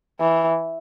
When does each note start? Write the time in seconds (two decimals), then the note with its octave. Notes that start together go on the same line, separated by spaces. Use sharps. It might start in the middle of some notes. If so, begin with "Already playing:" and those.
0.20 E3